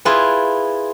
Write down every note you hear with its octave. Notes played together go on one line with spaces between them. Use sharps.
E4 F4 G#4 B4